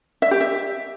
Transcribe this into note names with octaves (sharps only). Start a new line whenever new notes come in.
E5
G4
E5